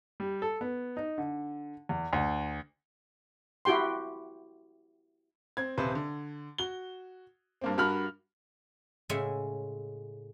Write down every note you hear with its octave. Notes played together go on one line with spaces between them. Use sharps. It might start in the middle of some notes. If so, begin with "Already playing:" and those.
G3
A4
B3
D#4
D3
E2
D2
E4 F#4 G4 G5 C6
C4 G#6
D#1 C3 B4 C5
D3
F#4 G7
G2 A#3 C4
G2 F#4 A#4 B5 F6
A2 C#3 G#3 E5 F#5 G#5